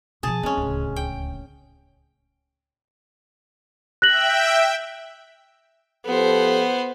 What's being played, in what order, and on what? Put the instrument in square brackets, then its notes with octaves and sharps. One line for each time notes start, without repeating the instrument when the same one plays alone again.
[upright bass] B2 F3 [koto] G#4 A5
[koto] G#3 C#4 [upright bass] C4
[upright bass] D1 C#2
[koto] G5
[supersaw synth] E5 G5 [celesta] F#6 A#6 F#7
[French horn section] F3 G4 A4 [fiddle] B3 C5